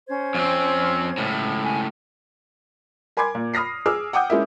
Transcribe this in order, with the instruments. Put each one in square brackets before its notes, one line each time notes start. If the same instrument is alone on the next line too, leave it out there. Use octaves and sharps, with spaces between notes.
[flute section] C#4 C5 G#6
[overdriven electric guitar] F2 C4
C#2 A2
[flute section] G#5
[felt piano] A#4 G#5 B5 C6 D6 G#6
A#2
B5 D#6 F6 A#6 C7
G#4 D6 E6 F6
F#5 G5 D6 D#6 G6
G#3 C#4 E4 A#4 E5